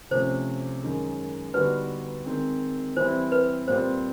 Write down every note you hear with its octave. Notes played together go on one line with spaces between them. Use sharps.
C3 F3 A3 C#4 C5
F#2 D#3 G#3 C#4
D3 G3 B3 D#4 F#4 B4
D#3 G#3 C4
E3 G3 C4 E4 C5
B4
A#2 G3 C4 F4 C5